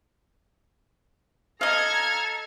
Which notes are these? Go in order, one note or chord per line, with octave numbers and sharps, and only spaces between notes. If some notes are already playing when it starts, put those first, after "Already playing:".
A4 D#5 F5 A#5 F6 G#6